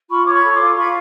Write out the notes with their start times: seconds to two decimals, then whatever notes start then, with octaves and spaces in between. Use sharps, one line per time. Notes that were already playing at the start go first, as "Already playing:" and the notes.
0.09 F4 B5 C#6
0.24 C#5 D6
0.32 B5 C#6
0.43 A4
0.54 C6 D6
0.60 F4
0.76 F4 B5 C#6